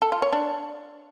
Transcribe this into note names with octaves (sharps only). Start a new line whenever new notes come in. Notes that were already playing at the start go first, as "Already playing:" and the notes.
A4
F4
C#5
D4